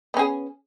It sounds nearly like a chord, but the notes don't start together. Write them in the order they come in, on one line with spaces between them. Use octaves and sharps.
B3 C#4 G#4